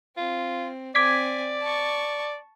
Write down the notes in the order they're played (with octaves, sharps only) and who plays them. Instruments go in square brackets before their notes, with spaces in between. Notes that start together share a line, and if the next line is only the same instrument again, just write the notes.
[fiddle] C4 [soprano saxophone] F4
[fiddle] C4 G#5 [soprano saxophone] D5 [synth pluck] D6 G#6 B6
[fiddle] A5 C#6